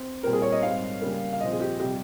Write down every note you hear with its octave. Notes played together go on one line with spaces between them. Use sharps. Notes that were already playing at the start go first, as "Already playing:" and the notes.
Already playing: C4
A#2 G3 C4 A#4
G#4
C#5
D#5
G#2 G3 C4 F5
C#3 G3 A#3
F5
A#2 F3 C4 D#5
G#4
G4
C3 G3 G4